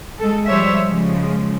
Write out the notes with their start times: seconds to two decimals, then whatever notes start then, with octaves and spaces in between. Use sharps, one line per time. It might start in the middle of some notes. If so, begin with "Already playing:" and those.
0.18 G#3 A4
0.47 F3 G3 C5 C#5 E5
0.85 C#3 F3 G#3